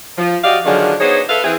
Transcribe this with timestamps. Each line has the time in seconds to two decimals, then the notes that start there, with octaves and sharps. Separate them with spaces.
0.18 F3
0.44 F#4 G4 D5 D#5 F5
0.65 D3 D#3 F3 F#3 D4 G#4
1.00 B3 D4 D#4 G#4 C5 C#5
1.29 A4 B4 E5 F5
1.44 E3 C4 G#4